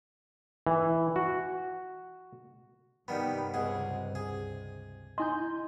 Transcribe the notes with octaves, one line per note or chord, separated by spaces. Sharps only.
E3
F#4
G2 C3 D#3 G3 B3 B5
C#2 G#4 D#5 F#5
C#2 G#4
E4 D#5 G#5 C6 G6